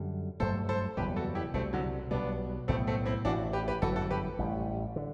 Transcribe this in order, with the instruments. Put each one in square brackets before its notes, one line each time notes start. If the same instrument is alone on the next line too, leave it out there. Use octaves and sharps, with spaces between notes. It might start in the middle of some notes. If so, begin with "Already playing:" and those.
Already playing: [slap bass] F#2 D3 G3
[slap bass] G2 F#3 A3 [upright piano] A4 C5
[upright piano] A4 C5
[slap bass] F#1 E2 B2 G3 [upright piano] G4 B4
[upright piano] F#4 A4
E4 G4
[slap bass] C2 B2 G3 [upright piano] A3 C4
[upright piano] D3 F#3
[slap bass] B1 B2 G3 [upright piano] B3 D4
[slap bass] B1 A2 F#3 B3 [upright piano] A3 C4
[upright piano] A3 C4
C4 E4
[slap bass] A1 A2 E3 [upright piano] D4 F#4
[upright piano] G4 B4
G4 B4
[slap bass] G1 F#2 E3 [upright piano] F#4 A4
[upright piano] F#4 A4
G4 B4
[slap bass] A1 A2 G3
D3